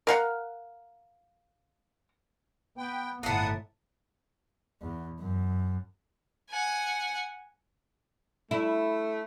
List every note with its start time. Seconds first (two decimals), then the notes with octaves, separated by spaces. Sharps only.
0.07 A#4 F5 F#5
2.77 B3 B4 G5
3.23 G1 A2 A#3 B3 F#5 A5 D#6
4.81 E2
5.20 F#2
6.50 F#5 G#5
8.51 A3 E4